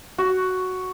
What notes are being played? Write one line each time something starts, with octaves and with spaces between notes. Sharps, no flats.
F#4